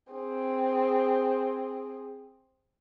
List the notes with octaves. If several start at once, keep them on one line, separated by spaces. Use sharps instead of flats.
C4 G#4